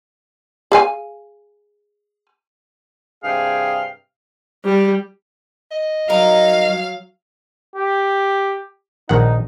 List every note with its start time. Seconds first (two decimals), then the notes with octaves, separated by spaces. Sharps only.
0.72 G#4 F5 G#5
3.24 G2 C3 G#4 F5 G5
4.65 G3
5.71 D#5
6.10 F#3 D#4 A#4 F5
7.76 G4
9.09 A#1 D#3 D#4 F#5